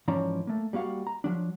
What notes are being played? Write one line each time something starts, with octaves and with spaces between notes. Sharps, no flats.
G#2 E3 F3 C#4 D5 A#5
A3 A#3
G3 A#3 F#4 F5 F#5
A#5
F3 F#3 D4